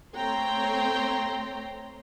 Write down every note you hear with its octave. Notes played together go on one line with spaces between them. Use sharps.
A3 C4 C#5 G5 A#5 C6